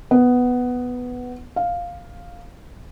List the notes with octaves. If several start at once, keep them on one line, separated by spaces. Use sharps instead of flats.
B3
F5